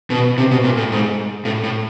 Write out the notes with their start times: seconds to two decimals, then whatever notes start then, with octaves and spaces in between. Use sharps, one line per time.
0.10 B2
0.38 C3
0.51 B2
0.64 A#2
0.77 A2
0.92 G#2
1.45 A2
1.64 A2